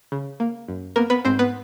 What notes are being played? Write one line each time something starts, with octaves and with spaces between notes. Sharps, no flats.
C#3
A#3
F#2
A#3 B3 A#4
B3 B4
G#2 C4 C5
B3 B4